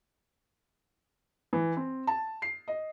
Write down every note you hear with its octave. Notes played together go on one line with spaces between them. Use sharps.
E3
C4
A5
C7
D#5